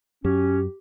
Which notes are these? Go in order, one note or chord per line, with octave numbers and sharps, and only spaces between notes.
F#2 F#3 C#4 G4